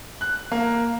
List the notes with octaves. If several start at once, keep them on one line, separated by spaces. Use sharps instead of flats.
F#6
A#3